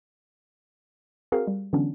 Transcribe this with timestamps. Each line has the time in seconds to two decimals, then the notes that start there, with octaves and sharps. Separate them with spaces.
1.32 C4 F#4 G#4 A#4 F5
1.47 G3
1.73 D3 E3 F#3 B3 C#4 D4